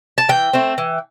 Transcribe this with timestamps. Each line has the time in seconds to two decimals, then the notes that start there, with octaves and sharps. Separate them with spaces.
0.18 A5
0.29 E3 G5
0.53 A3 C4
0.78 E3